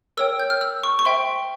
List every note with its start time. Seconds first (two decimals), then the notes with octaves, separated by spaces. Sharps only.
0.17 A#4 C#5 G5 E6
0.40 G6
0.50 F6
0.61 E6
0.83 C#6
0.99 C#6
1.05 C5 E5 G5 C6